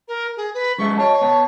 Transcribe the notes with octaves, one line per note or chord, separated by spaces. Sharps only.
A#4
G#4
B4
F#2 G#3 E5 C#6
C#5 D#5 A5
B3 A5